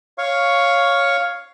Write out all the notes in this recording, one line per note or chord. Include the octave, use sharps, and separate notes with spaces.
C#5 F5 C#6